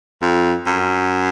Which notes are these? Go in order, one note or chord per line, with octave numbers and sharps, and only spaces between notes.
F2
F#2